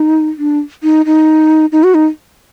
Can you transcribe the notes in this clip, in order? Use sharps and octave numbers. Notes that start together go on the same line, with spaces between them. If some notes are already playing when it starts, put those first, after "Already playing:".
Already playing: D#4
D4
D#4
D#4
D#4
F#4
D#4